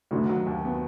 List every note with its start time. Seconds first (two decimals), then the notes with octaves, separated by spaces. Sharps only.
0.11 D2 D3 D#3
0.29 F#3
0.46 D#2
0.65 B3